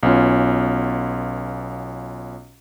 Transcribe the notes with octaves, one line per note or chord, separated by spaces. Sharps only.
B1 B3 C#4 F4